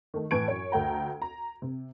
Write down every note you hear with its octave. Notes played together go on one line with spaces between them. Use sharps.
D#3 A3
A2 E3 A5 C#6 G#6 D7
F#2 C#5
D2 A3 G5 A#5
A#5
C3